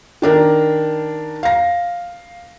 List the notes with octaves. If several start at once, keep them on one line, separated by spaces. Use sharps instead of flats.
D#3 D4 A#4
F5 A#6